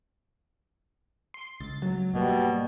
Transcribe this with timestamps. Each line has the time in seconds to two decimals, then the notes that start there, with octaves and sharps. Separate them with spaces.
1.34 C6
1.60 C#2 A6
1.82 F#3
2.14 G#2 B2 G3 A#3